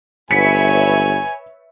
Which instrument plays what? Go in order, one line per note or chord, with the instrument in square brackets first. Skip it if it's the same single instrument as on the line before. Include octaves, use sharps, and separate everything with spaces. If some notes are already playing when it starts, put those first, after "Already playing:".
[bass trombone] G1 [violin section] B4 C#5 E5 [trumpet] G#5 [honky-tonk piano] B6 C#7